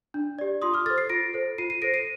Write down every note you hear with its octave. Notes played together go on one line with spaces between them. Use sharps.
D4
G4 D5
F4 C6 D#6
D6 F6
A4 C5 F6 A6
A6 C7
F4 A#6 D7
A4 C5
F4 C7 D#7
C7 D#7
A4 C5 A#6 D7
C7 D#7